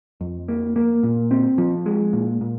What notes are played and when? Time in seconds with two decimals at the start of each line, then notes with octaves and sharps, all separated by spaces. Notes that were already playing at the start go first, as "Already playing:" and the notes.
0.21 F2
0.48 A#3
0.76 A#3
1.03 A#2
1.31 C4
1.58 F3
1.86 G#3
2.13 A#2
2.41 A#2